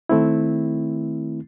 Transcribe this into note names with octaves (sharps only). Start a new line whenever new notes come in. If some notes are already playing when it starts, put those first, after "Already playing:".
D#3 A3 C4 E4